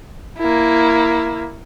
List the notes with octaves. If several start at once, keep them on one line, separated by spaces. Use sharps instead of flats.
A#3 E4